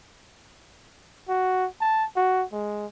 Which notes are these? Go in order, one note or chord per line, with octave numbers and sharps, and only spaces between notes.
F#4
A5
F#4
G#3